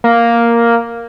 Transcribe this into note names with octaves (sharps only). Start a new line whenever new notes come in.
A#3